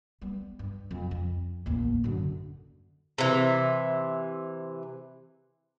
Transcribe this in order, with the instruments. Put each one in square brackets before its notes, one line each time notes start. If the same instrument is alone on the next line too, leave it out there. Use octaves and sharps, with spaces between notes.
[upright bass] G3 B3
G2
F2
F2
A1 D#2
F#2 D3
[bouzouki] C3 E3